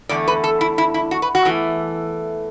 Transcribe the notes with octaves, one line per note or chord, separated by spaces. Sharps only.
E2 D3 A3 D5
B4
A4
E4
E4
E4
F#4
B4
F#4
E2 E3 A3